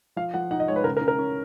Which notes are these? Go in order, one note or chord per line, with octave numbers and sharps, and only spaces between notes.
F3 F5
F3 F#5
D#4 F#5
D#5
G#3 C#5
B4
C#3 A#4
A#4
C#3
A#4
C#4